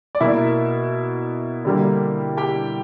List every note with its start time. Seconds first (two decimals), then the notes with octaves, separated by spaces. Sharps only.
0.15 D5
0.21 B2 A#3 E4 E5
1.65 D3 G3 A#3
2.37 G4 G5